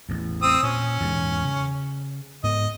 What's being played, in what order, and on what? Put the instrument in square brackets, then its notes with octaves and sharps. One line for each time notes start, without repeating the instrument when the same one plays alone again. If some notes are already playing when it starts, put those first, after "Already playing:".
[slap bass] A1 E2
[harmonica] C4 D#6 E6
[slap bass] A#2 [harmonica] C#4
[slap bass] E2 G#2 G#3
C#3
[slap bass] G#2 B3 [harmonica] D#5